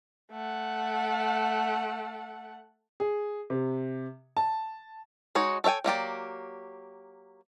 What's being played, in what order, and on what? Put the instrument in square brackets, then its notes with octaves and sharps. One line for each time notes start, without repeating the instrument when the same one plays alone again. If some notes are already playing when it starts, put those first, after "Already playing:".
[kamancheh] A3 F#5
[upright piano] G#4
C3
A5
[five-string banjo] G#3 D#4 F#4 C#5
A4 C#5 E5 G5 G#5
F#3 A#3 G4 D5